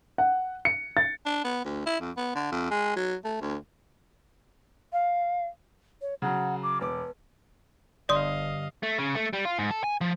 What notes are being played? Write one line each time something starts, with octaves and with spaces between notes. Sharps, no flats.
F#5
C#7
A6
D4
B3
D2
E4
F2
B3
D3
F2
G#3
F#3
A3
D2
F5
C#5
C#3 F#3 F#5
D6
E1 B4 D6
F#1 G2 D3 D5 D#5 F5 C6 D#6
A3
C#3
A3
G3
F4
G#2
A4
G#5
F3